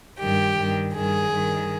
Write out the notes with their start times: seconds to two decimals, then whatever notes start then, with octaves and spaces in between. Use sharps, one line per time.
0.20 G2 D#3 G4
0.57 G2 D#3
0.94 G2 D#3 G#4
1.31 G2 D#3